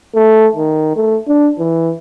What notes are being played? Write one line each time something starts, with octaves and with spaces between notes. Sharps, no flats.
A3
D#3
A3
D4
E3